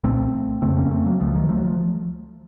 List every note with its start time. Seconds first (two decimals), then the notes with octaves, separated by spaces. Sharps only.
0.04 C2 A#2 A3 C4
0.62 F2 C#3 A3 C4
0.77 A#3 C#4
0.91 A3 C4
1.06 F#3 A#3
1.20 C#2 C#3 F3 A3
1.34 D#3 F#3
1.49 F3 A3
1.57 F#3
1.64 F3